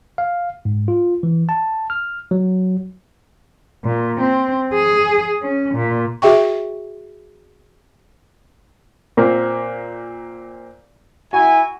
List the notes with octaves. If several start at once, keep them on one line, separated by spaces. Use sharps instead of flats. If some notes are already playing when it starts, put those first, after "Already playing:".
F5
G#2
F4
E3
A5
F6
F#3
A#2
C4
G#4
C#4
A#2
F#4 G#4 E5 G5 C#6
A#2 A#3 C4
E4 F#4 G#5